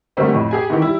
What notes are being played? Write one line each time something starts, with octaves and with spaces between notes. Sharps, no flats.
D3 F#3 G3 A3 A#3 C4
F2 A2
G4 G#4 G#5
D#3 E3 G4
G3 E4